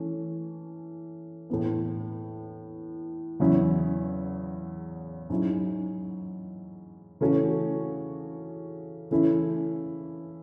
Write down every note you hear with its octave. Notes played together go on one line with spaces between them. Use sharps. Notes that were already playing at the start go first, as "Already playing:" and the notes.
Already playing: E3 A3 C#4
A2 E3 B3
E2 C#3 F#3 C#4 E4
G#2 F#3 C#4 E4
C#3 E3 A3 C#4 F#4
C#3 E3 A3 C#4 E4